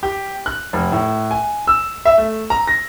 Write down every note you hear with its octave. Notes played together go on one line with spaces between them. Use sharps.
G4
F#6
F1
A2
G#5
E6
E5
A3
A#5
A#6